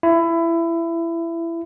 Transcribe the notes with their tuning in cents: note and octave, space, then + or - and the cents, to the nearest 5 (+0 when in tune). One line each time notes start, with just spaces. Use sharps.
E4 +20